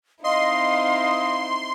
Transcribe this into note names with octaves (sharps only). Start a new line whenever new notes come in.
C4 D#4 E4 D#5 F5 C6